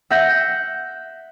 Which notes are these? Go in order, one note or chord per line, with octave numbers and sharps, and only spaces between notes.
E5 F#5 G6 A#6